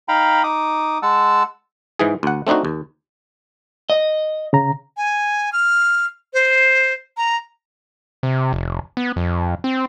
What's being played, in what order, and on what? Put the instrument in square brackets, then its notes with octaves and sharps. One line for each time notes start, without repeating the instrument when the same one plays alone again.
[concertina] D#4 F5 G5 A#5 B5
D#4 D6 D#6
G#3 F#5 A5 E6
[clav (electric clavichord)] G#2 E3 G#4
D2 F#5
A3 C4 D4 D#4 F#4
D#2
[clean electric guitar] D#5
[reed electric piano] C#3 A#5
[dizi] G#5
F6
C5
A#5
[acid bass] C3
F1
B3
F2
C4